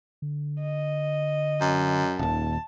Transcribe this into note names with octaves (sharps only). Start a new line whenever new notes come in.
D3
D#5
F#2
D#1 D#2 A5